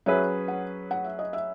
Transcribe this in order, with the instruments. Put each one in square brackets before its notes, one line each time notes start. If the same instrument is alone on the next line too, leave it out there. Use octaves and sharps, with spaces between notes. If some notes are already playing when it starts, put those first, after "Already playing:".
[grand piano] F#3 C#4 G#4 B4 [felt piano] E5
[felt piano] F#5
F#5
E5
D#5
E5